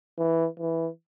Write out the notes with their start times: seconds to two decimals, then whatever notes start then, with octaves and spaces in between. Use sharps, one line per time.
0.18 E3
0.60 E3